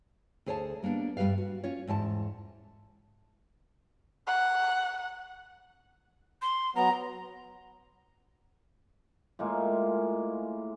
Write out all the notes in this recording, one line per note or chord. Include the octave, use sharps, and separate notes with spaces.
D2 G#4 C5 C#5 F#5 A5
G3 A#3 B3 D4
G2 G3 G4 B4 F5
F#4
C#4 F4 C#5
E2 G#2 G#5 A5
F#5
C6
F#3 B3 A#5
A2 G#3 A#3 F4